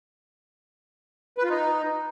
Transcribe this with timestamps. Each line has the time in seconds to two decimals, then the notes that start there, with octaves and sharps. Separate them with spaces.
1.38 B4
1.44 F4
1.50 D#4